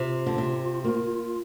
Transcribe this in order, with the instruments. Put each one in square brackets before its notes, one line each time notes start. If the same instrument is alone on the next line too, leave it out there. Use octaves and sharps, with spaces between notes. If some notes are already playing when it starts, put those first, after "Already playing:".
Already playing: [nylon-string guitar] C3 [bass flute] F4
[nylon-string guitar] D3
C3
A#3